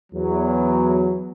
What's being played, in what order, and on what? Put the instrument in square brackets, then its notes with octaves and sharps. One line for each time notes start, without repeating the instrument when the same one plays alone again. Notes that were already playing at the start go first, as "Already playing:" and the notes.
[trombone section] E2 F#3